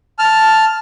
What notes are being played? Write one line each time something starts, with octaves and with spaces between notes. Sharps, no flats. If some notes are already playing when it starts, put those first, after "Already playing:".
A5 F6